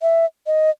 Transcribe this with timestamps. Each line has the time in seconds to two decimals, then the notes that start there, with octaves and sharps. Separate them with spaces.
0.02 E5
0.47 D#5